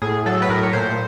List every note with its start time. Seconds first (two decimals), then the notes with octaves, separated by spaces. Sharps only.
0.02 A2 G#4
0.26 F#3 A4
0.42 B4
0.49 A2 A#4
0.63 C#5
0.73 A#2 C5